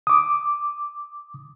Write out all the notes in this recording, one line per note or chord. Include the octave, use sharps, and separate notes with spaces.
D6 D#6